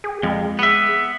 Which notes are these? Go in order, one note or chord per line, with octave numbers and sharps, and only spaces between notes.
G#4
F2 G#3
B3 E5